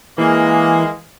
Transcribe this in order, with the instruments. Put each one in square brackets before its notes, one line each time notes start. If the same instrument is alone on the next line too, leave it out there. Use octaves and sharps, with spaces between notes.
[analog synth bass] E3 [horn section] G#3 A#3